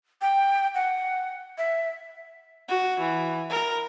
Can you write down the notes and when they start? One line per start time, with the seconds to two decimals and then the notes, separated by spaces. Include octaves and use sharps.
0.22 G5
0.75 F#5
1.58 E5
2.68 F#4
3.00 E3
3.50 A#4